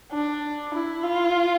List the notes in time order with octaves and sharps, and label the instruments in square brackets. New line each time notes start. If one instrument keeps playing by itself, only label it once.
[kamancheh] D4
E4
F4